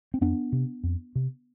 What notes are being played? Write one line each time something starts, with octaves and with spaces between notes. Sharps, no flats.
C4
F2 B3 D4
C3
F2
C3